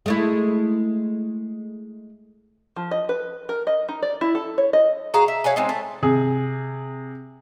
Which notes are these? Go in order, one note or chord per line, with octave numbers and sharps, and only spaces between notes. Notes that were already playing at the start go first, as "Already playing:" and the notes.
G#3 A3 E4
F3
D#5
B4
A#4
D#5
D#4
D5
E4
A4
C#5
D#5
F#4 G#4 F5 A#5
E5
C#5 F5 F#5 G#5
G#3 C4 D#4
A3
C3 G#4